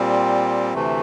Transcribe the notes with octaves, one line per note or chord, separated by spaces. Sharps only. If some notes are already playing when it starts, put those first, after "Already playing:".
Already playing: A#2 G3 C4
D2 C3 E3 A3